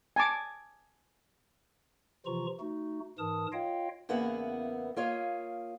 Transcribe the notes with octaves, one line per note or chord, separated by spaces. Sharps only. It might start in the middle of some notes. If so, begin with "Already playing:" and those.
G#5 A5 D6
C3 E3 F3 F4 A#5 C#6
A3 D#4 F#4
G#2 E3 A#4 A5 D#6
F4 C#5 D#5 F5 G5
E2 C#3 A#3 B3 E4 F#5
A#3 F4 C#5 D#5 F5